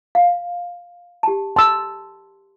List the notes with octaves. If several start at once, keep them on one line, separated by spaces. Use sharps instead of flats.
F5
G4 A5
A5 C6 E6